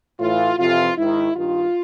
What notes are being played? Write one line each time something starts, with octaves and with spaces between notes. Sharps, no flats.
A2 E3 F4
F2 C3 E3 F4
G#2 D#3 E4
G2 D#3 F4